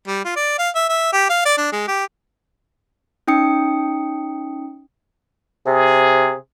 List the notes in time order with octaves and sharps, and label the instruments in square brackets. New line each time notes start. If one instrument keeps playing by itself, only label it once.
[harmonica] G3
F4
D5
F5
E5
E5
G4
F5
D5
D4
G#3
G4
[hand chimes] C#4 D#4 G5 D#6 C#7
[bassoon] C3 [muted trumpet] G#4